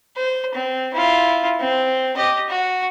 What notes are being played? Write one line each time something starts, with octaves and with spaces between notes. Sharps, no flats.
C5
C4
E4 F4
C4
G4 D#5
F#4